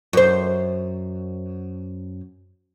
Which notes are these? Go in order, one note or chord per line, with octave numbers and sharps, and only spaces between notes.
F#2 C5